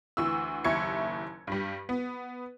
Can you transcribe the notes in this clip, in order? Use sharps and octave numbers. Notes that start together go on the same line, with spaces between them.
D2 E3 C#6 E6
F#1 D#2 E4 C#6 G#6 C#7
G2 G3
B3